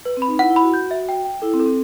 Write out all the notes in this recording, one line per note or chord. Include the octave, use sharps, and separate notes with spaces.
B4
C4
B5
D#4
E4 F#5
E4
B5
F#4
G6
E5
G5
G5
E4 A4
C4
A4
C4